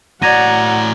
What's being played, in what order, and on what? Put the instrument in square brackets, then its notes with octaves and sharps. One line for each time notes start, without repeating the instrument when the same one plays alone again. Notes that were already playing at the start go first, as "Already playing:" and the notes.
[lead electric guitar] A2 A#5 [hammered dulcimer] F#3 D5 [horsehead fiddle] F#5 [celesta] G#6 A#6 D#7